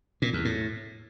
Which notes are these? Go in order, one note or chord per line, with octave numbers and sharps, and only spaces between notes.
A#2
E2
A2